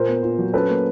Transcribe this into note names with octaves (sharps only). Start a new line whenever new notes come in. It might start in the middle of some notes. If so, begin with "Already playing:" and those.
Already playing: A#2 A#4 C5
B3
A#2
F#3
C#4 A4 B4
A#3